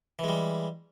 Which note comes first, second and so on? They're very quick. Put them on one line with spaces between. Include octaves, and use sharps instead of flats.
E3 G#3 G3